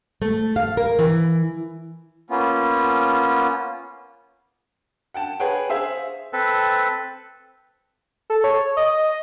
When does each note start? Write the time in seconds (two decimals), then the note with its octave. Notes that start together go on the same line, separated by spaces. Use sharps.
0.22 A3
0.56 F5
0.77 A#4
0.99 E3
2.30 A#3 B3 C#4 F4
5.14 F#5 G5 A5
5.40 G#4 B4 C#5 F#5 G5
5.69 G#4 C5 E5 F5 G#5
6.33 C4 A4 B4
8.30 A4
8.44 C#5
8.77 D#5